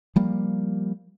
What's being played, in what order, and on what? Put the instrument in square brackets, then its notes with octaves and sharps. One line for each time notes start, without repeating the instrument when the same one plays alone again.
[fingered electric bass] F3 G3 A#3